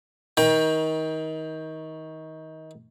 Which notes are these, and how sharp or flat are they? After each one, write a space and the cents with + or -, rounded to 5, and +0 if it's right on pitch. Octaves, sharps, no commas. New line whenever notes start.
D#3 +25 G5 +15 A#5 +40